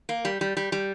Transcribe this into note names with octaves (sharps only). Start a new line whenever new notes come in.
A#3
G3
G3
G3
G3